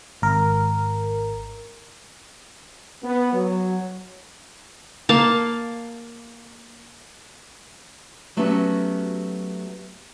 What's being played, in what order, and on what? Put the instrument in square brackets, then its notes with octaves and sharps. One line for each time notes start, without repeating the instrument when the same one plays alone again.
[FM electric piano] G#1 A#4
[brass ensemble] B3
F#3
[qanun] A#3 F5 A5
[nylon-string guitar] F#3 A3 B3 C#4 F#4 G4